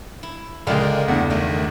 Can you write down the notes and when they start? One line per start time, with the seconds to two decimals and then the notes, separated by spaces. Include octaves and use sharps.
0.23 E4
0.67 C#2 D3 G#3 D4 F4 A#4 D5 G5
1.08 E2 G2 A3 F#5
1.30 D#3 A3 D#5 G5